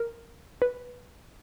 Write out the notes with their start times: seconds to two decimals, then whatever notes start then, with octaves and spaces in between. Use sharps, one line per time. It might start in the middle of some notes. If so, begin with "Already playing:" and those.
Already playing: A#4
0.62 B4